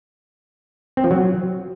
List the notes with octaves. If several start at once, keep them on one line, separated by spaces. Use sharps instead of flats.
C4
F3
F#3